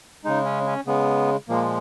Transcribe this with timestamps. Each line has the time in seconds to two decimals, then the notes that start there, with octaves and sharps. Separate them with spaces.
0.24 C#3 G#3 D#4
0.45 C#4
0.66 C#4
0.87 C#3 G#3 B3
1.48 A#2 F3 G#3 A#3